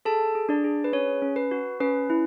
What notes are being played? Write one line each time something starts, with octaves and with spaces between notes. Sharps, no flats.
G#4 A4 A5
G#4
D4 D5
G#4
B4
C#4 C#5
C#4
B4
F#4
C#4 B4
E4